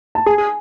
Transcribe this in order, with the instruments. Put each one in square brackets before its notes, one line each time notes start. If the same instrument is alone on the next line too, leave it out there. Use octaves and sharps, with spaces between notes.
[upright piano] A5
[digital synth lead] G#4 [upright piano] G#5
[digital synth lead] G#4